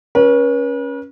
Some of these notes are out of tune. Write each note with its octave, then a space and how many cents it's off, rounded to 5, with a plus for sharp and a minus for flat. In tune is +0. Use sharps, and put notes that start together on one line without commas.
C#4 +0 B4 -45